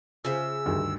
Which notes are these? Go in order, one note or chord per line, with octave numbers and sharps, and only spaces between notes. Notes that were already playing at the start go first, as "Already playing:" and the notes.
C#3 F4 C5 E5 E6
D2 G2 D#3